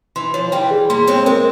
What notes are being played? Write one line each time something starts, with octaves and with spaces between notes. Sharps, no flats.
E3 C6
F3 C#5
E3 G3 G5
G#4
G3 A#3 C6
G#3 C4 C#5
G#3 C4 A#4